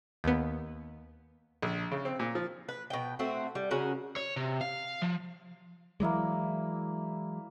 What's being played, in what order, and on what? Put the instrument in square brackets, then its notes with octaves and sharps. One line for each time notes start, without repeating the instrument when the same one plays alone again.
[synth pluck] D#2 B3
[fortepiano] A#1
C#3
C4
A#2
F3
[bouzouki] B4
B2 G5
A3 C4 F#4
G3
C#3 C#4 F#4 A#4
[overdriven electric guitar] C#5
C3
F5
F3
[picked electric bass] E3 F#3 G#3 [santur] A#3 E4 D5